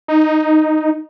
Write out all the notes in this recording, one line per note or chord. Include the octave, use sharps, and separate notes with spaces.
D#4